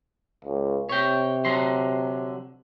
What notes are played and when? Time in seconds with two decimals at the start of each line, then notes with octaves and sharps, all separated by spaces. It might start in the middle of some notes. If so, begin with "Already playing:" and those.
0.45 C#2
0.89 C3 C#5 G5
1.45 D3 F#3 C6